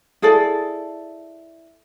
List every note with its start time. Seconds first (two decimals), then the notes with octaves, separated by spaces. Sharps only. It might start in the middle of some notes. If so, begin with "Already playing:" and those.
0.22 E4 G#4 A4 D5